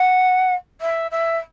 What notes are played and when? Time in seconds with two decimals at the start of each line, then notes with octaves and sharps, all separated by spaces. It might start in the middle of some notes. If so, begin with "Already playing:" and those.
Already playing: F#5
0.81 E5
1.11 E5